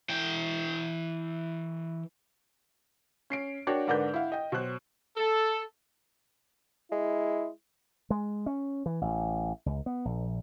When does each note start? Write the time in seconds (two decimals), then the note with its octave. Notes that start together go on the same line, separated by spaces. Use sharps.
0.09 E3 G5
3.30 C#4 C7 D7
3.67 D4 F#4 A#4 C#5 G5
3.87 G#2 D3 D4 A#4 B4 G6
4.14 E4 F5 F#5
4.32 D#5 G5
4.52 B2 F#3 C5 F#6
5.17 A4
6.91 G#3 E4
8.10 G#3
8.46 C#4
8.86 E3
9.01 A1
9.66 C#2
9.86 B3
10.05 A#1